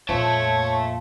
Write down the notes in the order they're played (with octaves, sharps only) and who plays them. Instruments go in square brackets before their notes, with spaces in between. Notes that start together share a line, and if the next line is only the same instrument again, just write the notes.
[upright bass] F2 A#2 [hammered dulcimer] F3 [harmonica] C#5 [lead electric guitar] E5 A5